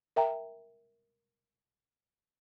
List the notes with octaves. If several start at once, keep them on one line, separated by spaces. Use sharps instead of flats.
A#4 E5 G5 A#5